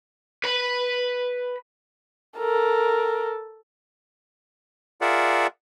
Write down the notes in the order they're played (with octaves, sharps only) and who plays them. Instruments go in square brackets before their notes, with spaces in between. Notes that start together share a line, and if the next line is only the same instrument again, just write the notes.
[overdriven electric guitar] B4 B5
[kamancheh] A4 A#4
[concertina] F4 G#4 A#4 D5 E5 F#5